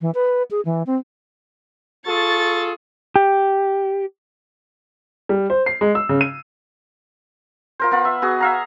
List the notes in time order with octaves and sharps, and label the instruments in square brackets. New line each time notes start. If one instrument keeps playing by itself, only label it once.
[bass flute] E3
B4
G#4
E3
C4
[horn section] F4 G#4 A4 [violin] C#6 A6
[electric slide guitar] G4
[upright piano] G3
C5
C7
G#3
E6
C#3
D#7
[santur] F4 A#4 C5
B3 F4 B5
E5
B3 F#4 G#4
E5 F5 A#5